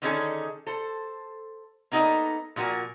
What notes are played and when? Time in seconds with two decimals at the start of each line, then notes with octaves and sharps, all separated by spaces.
0.02 D3 D#3 C#4 D#4 G#4 A4
0.67 A4 C5
1.91 A#3 B3 D#4 G#4 A4 D#5
2.56 A#2 F3 F#4 A#4 G#5